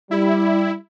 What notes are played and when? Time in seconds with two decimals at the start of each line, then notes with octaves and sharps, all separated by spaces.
0.11 G3 E4